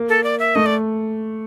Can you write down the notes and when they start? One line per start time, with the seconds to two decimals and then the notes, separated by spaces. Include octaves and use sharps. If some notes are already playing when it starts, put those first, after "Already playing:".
Already playing: A#3
0.09 A4
0.24 D5
0.39 E5
0.55 A3 D#5
0.66 D5